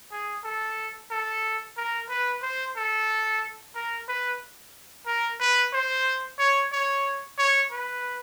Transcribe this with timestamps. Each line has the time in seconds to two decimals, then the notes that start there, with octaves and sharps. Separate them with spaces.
0.11 G#4
0.44 A4
1.11 A4
1.77 A#4
2.09 B4
2.42 C5
2.76 A4
3.75 A#4
4.08 B4
5.07 A#4
5.40 B4
5.73 C5
6.39 C#5
6.72 C#5
7.38 C#5
7.72 B4